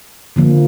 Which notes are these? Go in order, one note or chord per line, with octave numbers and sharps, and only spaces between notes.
D3 F3 A#3